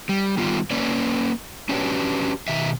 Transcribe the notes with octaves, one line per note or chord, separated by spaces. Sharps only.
G3
D#3 G3 B3 F4 G4
A#3 C#4 B4 C#5 D5
C#4 D4 F#4 G4 B4 C#5
B2 D#3 E5